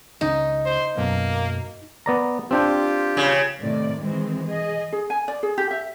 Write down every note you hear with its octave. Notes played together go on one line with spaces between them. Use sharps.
C#2 C#3 D#4
C5
B1 F#2 A#3 B3
B3 D5 A#5
C4 D4 F4 G4 G5
C#3
A2 C3 D#3 D5
D#3 E3 G#3 C4
G#4 D#5
G#4
G#5
D5
G#4
G4
E5